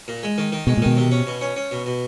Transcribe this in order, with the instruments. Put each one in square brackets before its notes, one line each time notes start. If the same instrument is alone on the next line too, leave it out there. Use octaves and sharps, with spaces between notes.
[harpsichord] A#2
G#3
D#3
D#3
[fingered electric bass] B2 [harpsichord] G#3
[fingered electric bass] A#2
[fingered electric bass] B2 [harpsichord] D#3
[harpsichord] C3
C#4
B2
C#4
C#4
B2
B2